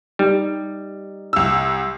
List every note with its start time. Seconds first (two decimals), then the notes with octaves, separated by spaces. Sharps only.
0.19 G3 D#4 G4
1.33 C2 E6